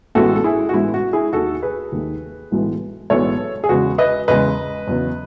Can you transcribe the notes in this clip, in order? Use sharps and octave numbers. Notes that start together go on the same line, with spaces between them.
A1 A2 G#3 B3 F#4 A4
A4
E4 G#4
F#4
A1 A2 G#3 B3 E4
F#4
E4 G#4
D#2 D#3 A3 F#4 A4
G#4 B4
D#2 D#3 A3
B1 A2 E3 G#3 B3
B1 A2 E3 G#3 B3 A4 C#5
G#4
E2 C#3 G#3 F#4
B4 D#5
E2 C#3 G#3 B4 D#5
E2 C#3 F#3 B3